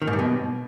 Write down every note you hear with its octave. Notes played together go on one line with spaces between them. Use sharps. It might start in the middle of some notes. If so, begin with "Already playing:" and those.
D#3
G#2
G2
B2